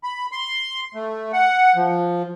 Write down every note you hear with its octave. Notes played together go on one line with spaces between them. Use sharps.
B5
C6
A3
F#5
F3